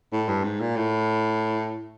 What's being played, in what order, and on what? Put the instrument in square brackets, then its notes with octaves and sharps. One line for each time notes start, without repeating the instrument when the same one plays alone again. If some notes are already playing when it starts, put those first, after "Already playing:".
[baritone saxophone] A2
G2
G#2
A#2
A2